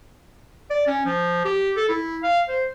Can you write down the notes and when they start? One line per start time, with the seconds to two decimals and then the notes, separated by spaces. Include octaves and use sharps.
0.70 D5
0.87 C#4
1.06 F3
1.45 G4
1.76 A4
1.89 E4
2.23 F5
2.49 C5